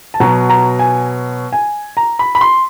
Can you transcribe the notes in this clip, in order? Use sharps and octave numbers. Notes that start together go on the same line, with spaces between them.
A5
B2 F#3 A#5
A#5
G#5
G#5
A#5
B5
B5
C6